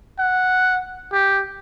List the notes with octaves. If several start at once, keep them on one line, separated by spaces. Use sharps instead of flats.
F#5
G4